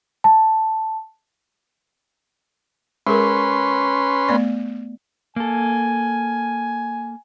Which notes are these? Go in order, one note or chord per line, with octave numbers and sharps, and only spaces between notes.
A5
G#3 C#4 G#4 A#4 B4 C6
A3 B3 D5
A#3 A4 G#5